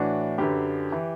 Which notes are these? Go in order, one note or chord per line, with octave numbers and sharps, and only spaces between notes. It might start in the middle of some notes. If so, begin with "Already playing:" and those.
Already playing: A2 E3 D4 F#4
F#2 D3 G4 B4
E3